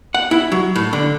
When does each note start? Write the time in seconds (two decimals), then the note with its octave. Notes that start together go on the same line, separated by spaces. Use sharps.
0.15 F#5
0.31 E4
0.52 F#3
0.76 A2
0.93 D3